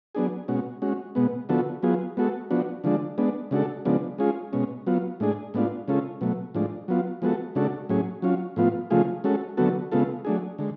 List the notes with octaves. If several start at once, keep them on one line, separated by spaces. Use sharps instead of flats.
F#3 B3 D4 G#4
B2 G#3 C#4 F#4
G#3 C#4 F#4
B2 G#3 B3
D3 F3 B3 F#4 A4
F#3 B3 F4 G#4
G#3 B3 F#4 A4
F3 B3 D4 F#4
D3 F3 G#3 D4
G#3 B3 D4
C#3 G#3 D4 F#4 A4
C#3 F3 G#3 B3 D4
G#3 C#4 F4 G#4
B2 G#3 C#4
F#3 B3 F4
A2 G#3 D4 G#4
A2 G#3 B3 D4 F4
C#3 G#3 C#4 F4 A4
B2 F#3 A3
A2 F3 G#3 D4
F#3 B3 F4
F3 G#3 B3 F#4 A4
C#3 G#3 D4 F#4 A4
A2 F#3 C#4 G#4
F#3 C#4 F4
A2 F3 B3 F4
C#3 F3 A3 F4 G#4
G#3 C#4 F#4 A4
D3 F#3 B3 F#4 A4
C#3 G#3 B3 F4 A4
F#3 A3 D4 G#4
D3 G#3